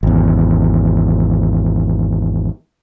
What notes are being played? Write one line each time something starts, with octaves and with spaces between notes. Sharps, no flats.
G#1 E2